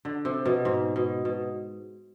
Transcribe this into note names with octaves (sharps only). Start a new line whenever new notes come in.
D3
C3
B2
G#2
B2
B2